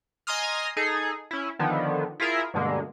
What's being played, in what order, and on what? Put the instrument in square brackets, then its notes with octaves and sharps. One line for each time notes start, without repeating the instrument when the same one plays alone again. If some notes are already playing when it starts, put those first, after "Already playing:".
[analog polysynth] D#5 G#5 A#5 C6 D#6 F6
D#4 G#4 A4
C#4 E4
D3 D#3 F3 B3
E4 F4 G#4 A#4 E5
G2 B2 D3 G#3 A#3